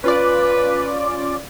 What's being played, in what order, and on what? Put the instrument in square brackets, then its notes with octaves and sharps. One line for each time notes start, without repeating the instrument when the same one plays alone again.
[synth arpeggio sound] C#4 F4 D5 [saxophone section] B4